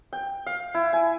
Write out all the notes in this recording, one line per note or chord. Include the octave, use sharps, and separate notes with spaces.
G5
F5
E4
G#5